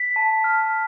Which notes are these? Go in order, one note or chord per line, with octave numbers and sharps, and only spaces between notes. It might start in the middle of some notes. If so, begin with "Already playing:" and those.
Already playing: B6
A5
F6